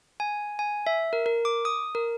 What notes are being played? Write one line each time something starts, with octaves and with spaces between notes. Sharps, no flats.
G#5
G#5
E5
A#4
A#4
D6
D#6
A#4